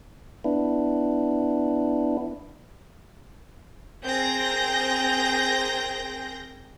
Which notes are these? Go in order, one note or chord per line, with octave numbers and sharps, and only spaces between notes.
B3 D4 E4
C4 G#4 A#4 G6 A#6